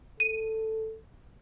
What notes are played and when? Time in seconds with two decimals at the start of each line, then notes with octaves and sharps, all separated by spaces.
0.20 A4 D#7